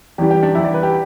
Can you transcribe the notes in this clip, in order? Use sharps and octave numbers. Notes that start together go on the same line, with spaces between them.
E2 E3 G3 G4
G4
D4
E2 E3 G3 E4
D5
B4
G4